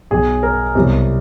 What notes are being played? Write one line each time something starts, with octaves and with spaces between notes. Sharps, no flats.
B1 B2 F#3 G#4
A#4
C2 B2 F#3